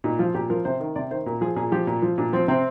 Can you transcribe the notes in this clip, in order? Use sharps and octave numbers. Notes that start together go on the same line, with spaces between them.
A#2 D#4
F3 F4
A#2 G4
F3 A#4
C3 C5
D#3
C3 D5
D#3 C5
A#2 A#4
F3 G#4
A#2 G#4
F3 G4
A#2
F3
A#2 D4
F3 C4
C3 C4